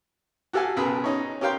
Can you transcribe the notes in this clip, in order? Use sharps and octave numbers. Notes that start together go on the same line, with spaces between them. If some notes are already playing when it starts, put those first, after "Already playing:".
F#4 G4 A4 F5 G#5
B1 C#3 G#4 A#4 B4 D#6
C#4 D#4 C#5
C#4 G4 A#4 F5 G5 C6